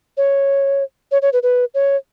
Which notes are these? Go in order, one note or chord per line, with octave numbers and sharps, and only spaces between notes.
C#5
C#5
C#5
B4
B4
C#5